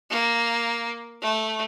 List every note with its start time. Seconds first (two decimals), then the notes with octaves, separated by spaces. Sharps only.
0.10 A#3
1.22 A3